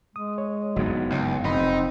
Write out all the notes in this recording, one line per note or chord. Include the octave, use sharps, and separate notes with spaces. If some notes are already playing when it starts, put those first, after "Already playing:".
G#3 D#6
C#5
F#1 G2 F#3 B3 D#4
C#2
F1 C4 D#4 B5 C6